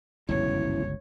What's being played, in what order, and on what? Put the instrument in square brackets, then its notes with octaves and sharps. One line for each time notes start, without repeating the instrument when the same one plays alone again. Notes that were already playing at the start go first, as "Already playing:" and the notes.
[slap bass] G1 C#2 [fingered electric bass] F#2 B2 [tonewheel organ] C#4 E4 [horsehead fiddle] C#5